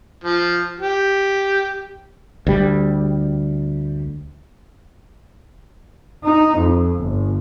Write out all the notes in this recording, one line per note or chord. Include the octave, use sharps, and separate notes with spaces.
F3
G4
D2 G3
D#4
F2
G1